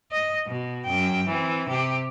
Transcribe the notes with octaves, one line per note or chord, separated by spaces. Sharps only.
D#5
B2
F#2 G5
E3 C4
C3 G4